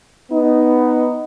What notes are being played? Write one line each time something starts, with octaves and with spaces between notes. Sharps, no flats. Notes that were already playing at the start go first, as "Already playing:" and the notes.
B3 D#4